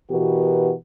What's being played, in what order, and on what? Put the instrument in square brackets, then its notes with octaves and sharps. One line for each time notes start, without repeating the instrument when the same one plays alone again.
[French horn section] B2 E3 B3 F#4 G4 A#4